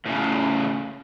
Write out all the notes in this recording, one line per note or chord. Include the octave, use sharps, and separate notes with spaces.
A2 C#3